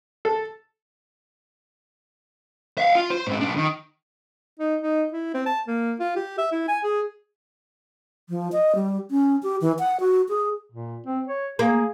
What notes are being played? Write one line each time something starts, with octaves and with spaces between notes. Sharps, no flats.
A4
E5 F5
F4
C5
G#2 C4
B1 D4
D#3
D#4
D#4
E4
C4
A5
A#3
F4
G4
E5
E4
G#5
G#4
F3
D#5
G3
C#4
G4
E3
F#5
F#4
G#4
A#2
C4
C#5
A#3 G#4